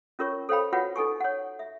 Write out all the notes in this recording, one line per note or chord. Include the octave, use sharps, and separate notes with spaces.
C#4 F4 A#4 C#5 C#6
A4 C5 C#5 F5 G5 B5
F4 F#4 B4 C#5 F#5 G5
D#4 A4 G#5 C#6
C#5 F#5
E5